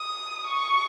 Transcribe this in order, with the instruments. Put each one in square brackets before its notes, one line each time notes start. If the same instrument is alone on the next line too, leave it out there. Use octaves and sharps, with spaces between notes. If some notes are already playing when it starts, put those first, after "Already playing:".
Already playing: [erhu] D#6
C#6